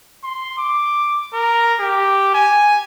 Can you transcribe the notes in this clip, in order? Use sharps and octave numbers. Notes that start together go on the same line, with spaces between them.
C6
D6
A#4
G4
G#5